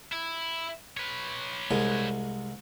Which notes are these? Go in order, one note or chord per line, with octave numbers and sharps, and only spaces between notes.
E4
B4 C#5
C2 G#3